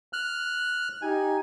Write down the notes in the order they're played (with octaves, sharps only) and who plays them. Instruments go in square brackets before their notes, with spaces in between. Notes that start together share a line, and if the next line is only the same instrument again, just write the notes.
[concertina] F6 F#6
[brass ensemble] D#4 G4 [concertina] G#5